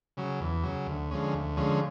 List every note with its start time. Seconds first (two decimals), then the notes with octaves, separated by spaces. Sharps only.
0.17 C#3 F#3
0.41 E2
0.64 C#3 F#3
0.87 D2
1.11 D3 F3 G#3 C#4
1.34 D2
1.57 D3 F3 G#3 C#4